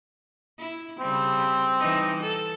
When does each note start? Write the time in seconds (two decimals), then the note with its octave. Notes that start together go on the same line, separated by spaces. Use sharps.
0.59 E4
1.00 C#3 G3 C4
1.79 E3 G3 D#4
2.22 A4